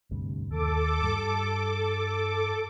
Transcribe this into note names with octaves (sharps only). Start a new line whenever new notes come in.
D2 G2 C3
D#2 A4 D6
G2 G3